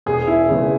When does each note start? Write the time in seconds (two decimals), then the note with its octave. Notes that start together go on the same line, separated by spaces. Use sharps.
0.06 E1 G#4
0.27 E4
0.49 E2 C#3 G#3